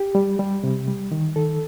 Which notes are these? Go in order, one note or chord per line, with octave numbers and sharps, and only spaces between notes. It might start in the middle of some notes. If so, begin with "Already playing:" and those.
Already playing: G4
G3
G3
C3
G3
D#3
D#3 A4